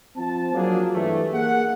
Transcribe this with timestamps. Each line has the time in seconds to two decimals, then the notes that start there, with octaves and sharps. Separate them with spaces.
0.17 F3 C4 A5
0.53 F3 F#3 A#3 D4 G#4
0.93 G2 E3 A3
1.33 A#3 G#4 F#5